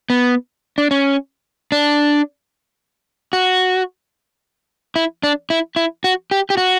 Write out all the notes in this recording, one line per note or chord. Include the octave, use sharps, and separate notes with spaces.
B3
D4
C#4
D4
F#4
E4
D4
E4
E4
F#4
G4
G4
F#4